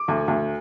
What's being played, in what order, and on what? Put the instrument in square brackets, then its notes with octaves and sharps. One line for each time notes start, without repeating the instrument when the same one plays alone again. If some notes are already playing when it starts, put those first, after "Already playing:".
Already playing: [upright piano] D6
D2
D2